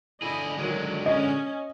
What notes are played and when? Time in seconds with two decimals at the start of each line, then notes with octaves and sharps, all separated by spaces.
0.22 D3 E4 G#4 D#5
0.57 D3 D#3 F#3 G#3
1.06 C#4 D#5